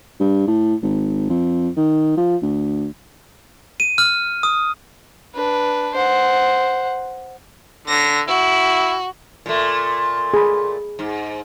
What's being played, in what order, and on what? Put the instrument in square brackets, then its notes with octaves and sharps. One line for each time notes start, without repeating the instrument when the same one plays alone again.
[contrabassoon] G2
A2
G#1
F2
D#3
F3
D2
[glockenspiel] D#7
F6
D#6
[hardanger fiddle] D4 B4
C5 F#5
[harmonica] D3 [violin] A#6
[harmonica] E4 [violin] F#4
[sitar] A#2 A3 [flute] C6
[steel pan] G#4 B5
[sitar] G#2